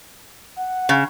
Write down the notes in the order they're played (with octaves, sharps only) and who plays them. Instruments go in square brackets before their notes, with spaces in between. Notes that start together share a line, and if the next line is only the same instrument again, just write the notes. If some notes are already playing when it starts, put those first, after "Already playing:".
[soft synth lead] F#5
[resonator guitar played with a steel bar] C#3